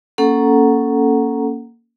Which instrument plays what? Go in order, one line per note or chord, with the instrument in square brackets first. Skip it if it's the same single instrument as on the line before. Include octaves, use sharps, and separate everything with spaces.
[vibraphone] A#3 C#4 A4 F#5 A#5